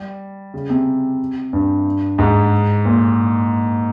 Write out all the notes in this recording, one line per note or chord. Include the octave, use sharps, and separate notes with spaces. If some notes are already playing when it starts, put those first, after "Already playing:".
Already playing: G3
C#3
C3
G2
G#2
A#2